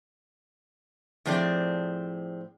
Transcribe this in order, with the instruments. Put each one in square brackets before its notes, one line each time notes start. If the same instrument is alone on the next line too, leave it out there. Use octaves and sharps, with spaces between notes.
[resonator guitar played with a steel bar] A2 F3 C4 G#4 D5